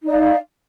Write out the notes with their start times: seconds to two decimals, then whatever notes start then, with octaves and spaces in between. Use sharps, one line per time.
0.03 D#4
0.07 D5
0.12 F5